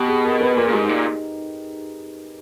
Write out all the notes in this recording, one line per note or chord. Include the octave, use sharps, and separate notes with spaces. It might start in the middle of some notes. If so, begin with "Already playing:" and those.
Already playing: B2 G4
G#4
A#4
B4
A#2 A#4
G#4
A#2
G#2 G4
D#4
A#2